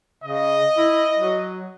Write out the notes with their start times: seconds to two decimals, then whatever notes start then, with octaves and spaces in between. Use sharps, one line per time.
0.24 C#3 D#5
0.77 E4
1.19 F#3